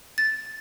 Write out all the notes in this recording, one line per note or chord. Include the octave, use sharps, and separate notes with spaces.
A6